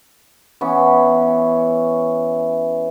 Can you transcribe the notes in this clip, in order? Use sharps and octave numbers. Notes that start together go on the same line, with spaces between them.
E3 B3 C#4